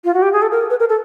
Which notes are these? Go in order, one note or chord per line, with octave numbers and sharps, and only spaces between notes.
F4
F#4
G4
G#4
A4
A#4
B4
A#4
A4